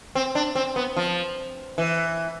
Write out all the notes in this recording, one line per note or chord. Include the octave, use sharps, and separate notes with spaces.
C4
D4
C4
B3
F3
E3